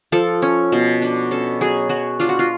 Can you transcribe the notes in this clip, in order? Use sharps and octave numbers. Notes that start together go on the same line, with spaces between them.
F3 A4
C#4
B2
D4
C#4 A4
F#3 G#4
F#3 F#4
D4 F4
F#4
F4